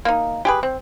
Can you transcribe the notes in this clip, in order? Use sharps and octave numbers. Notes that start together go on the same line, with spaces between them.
A#3 D#4
G4 G#4 B4
C4